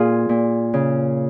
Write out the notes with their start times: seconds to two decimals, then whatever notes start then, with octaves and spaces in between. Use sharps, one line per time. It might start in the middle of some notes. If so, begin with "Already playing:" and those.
Already playing: A#2 F4 G#4
0.29 A#2
0.74 C#3